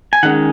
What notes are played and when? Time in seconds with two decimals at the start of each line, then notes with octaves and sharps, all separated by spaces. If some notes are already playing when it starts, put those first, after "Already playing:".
0.13 G#5
0.23 D#3 G#3 C#4 F#5